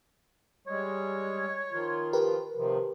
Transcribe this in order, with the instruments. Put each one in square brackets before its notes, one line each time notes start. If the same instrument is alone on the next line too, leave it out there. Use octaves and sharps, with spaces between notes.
[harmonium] G3 G#3 [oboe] C#5
[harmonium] D#3 F3 F4
[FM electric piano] G4 A#4 B4
[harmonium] C3 D#3 F3